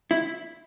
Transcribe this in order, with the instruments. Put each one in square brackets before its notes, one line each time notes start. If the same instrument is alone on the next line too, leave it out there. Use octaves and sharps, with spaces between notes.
[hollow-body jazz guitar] E4